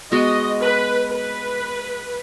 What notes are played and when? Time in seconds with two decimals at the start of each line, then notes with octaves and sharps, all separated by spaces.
0.12 G#3 B3 F#4 D#5
0.61 B4
1.12 B4